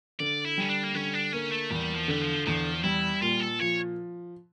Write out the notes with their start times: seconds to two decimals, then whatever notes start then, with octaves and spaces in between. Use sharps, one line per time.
0.19 D3 D5
0.45 E4
0.58 G3 C#4
0.70 D4
0.84 A#3
0.95 D3 C#4
1.14 D4
1.33 A#3 C#4
1.51 A3
1.71 E2 G3
1.95 F3
2.08 D3 G3
2.22 F3
2.46 E2 F3
2.84 G3 E4
3.21 A#2 F4
3.41 A4
3.60 F3 C#5